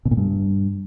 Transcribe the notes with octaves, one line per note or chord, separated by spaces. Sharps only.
B2
A#2
G2